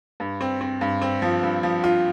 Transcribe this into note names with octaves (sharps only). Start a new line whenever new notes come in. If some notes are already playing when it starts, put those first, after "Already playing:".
G2
C4
C4
G2
C4
F3
G2
F3
F4